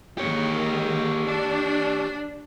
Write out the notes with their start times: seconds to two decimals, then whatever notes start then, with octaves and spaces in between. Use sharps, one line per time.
0.18 D#3 G#3 A#3 G4 C#5
1.25 D4